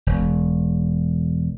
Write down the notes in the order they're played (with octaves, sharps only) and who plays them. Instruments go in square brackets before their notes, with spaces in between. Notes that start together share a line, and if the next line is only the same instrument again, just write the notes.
[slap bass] E1